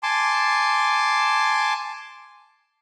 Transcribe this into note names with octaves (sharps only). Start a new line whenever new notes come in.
G#5 A5 C6 D6